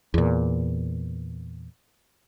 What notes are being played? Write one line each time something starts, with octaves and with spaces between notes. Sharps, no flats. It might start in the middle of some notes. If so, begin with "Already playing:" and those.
E2 A#2